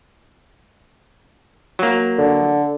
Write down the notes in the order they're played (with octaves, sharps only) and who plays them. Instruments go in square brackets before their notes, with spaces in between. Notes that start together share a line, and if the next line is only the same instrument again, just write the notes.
[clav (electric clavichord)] F#3 A#3
[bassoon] D3